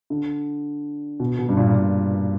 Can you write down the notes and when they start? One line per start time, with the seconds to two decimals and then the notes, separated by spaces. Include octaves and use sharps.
0.10 D3
1.20 B2
1.39 B2
1.49 G2
1.57 A#2
1.75 A#2